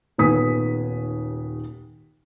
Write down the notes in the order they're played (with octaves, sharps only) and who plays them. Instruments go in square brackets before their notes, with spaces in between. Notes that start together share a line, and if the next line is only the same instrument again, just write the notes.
[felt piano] D#1 D#2 B3 G#5 D#6 B6